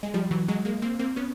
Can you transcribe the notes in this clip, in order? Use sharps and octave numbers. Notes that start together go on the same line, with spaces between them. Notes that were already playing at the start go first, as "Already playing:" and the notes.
G#3
F3 G3
E3 F#3
F#3 G#3
G#3 A#3
A#3 C4
A#3 C4
B3 C#4